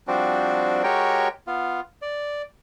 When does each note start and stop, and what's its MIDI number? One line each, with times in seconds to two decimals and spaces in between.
0.08 0.83 53
0.08 0.83 55
0.08 0.83 60
0.08 0.83 62
0.08 0.83 66
0.84 1.28 56
0.84 1.28 66
0.84 1.28 67
0.84 1.28 70
0.84 1.28 73
0.84 1.28 79
1.47 1.80 59
1.47 1.80 65
2.02 2.42 74